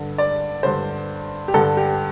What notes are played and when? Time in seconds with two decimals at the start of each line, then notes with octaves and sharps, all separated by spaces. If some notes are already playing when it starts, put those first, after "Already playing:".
Already playing: G2 D3
0.18 D5
0.63 G2 D3 C5
1.48 G4
1.54 G2 D3 A4
1.77 G4